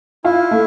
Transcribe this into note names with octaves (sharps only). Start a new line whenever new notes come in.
E4 F4
A3